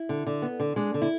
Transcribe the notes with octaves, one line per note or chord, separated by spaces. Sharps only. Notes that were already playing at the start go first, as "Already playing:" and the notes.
Already playing: E4
D3
D3
B3
D3
G#3 D4
D3
E4